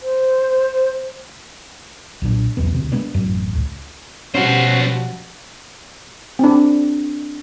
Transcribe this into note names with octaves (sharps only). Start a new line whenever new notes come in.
C5
B1 A#2 D4
B1 E2 B3
D2 C3
G#3 A#3 B3 D4
A1 F#2
C#2
B2 F3 G3 B3 C#4 F#4 C5
C4 D4